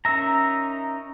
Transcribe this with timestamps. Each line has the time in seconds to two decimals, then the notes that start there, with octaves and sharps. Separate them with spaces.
0.05 C#4 D#4 A#4 E5 A#5